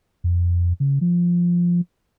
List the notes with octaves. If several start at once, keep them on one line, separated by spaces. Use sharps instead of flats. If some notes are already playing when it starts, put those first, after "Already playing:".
F2
C#3
F3